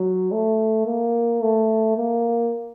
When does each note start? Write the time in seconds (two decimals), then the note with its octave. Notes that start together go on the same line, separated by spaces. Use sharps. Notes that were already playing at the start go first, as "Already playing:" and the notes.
Already playing: F#3
0.32 A3
0.86 A#3
1.41 A3
1.97 A#3